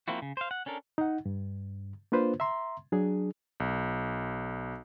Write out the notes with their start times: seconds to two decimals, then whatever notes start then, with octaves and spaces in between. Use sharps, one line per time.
0.08 F3 A#3 C4 E4 F#4
0.22 C#3
0.37 C5 F5
0.51 F#5
0.66 C#4 D4 A4 A#4
0.98 D#4 F#5
1.26 G2
2.12 A#3 D4 F4 B4 C5
2.40 E5 A#5 C6
2.92 F#3 D4 G#4
3.60 B1